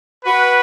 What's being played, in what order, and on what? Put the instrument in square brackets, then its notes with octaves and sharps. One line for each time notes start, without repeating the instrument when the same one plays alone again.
[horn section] F#4 B4